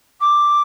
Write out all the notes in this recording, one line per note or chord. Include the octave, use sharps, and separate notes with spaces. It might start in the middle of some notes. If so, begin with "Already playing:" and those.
D6